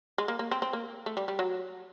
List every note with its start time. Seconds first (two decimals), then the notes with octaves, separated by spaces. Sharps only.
0.18 G#3
0.28 A#3
0.39 A#3
0.51 C4
0.62 C4
0.73 A#3
1.06 A3
1.17 G3
1.28 G3
1.39 F#3